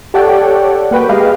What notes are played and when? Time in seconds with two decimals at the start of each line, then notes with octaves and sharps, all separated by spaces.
0.14 G4 A4 C#5 D5 F#5 G5
0.91 A#3 F#4 B4 G5
1.09 G#3 G4 G#4 B4 D#5 F5